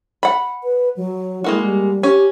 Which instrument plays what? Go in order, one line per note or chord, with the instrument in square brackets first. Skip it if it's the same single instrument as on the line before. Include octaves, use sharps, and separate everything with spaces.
[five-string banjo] F#5 B5
[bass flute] B4
F#3
[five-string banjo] G#3 A#3 F#4 [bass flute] E4
[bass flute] G3
[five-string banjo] C#4 [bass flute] G4